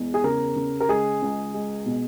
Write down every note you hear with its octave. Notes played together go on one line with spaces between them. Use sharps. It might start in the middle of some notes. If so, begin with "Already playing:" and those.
Already playing: E2 G#3
G#4
C#3 A#4
C#3
A#4
G#3 G#4
C#2
G#3
B2